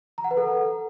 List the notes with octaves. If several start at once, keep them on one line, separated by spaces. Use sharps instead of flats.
A#5
F#5
B4
A4